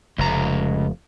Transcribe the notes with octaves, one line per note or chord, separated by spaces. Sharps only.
F1 C#2 A#5